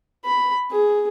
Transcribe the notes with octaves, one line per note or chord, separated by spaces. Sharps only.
B5
G#4